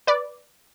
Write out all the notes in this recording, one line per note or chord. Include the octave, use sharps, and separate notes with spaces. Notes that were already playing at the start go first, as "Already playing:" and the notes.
B4 D5